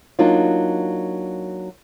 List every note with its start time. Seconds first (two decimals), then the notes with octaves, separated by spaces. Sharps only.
0.19 F#3 A#3 D4 D#4 F4